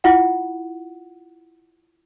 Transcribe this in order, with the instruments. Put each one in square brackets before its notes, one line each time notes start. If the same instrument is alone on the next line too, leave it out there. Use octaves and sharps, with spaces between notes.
[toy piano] E4 F4 F#5